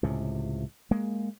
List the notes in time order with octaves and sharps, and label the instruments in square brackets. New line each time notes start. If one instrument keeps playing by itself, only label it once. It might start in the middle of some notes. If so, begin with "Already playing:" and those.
[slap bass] C#2 A2 C3
G#3 A#3